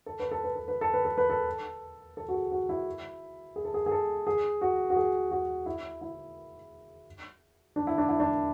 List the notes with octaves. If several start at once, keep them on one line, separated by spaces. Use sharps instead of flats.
A4
B4
A4
B4
A4
B4
A4
B4
A4
B4
A4
A4
F#4
G#4
F#4
E4
G#4
A4
G#4
G#4
A4
G#4
F#4
F#4
G#4
F#4
E4
E4
D4
E4
D4
E4
D4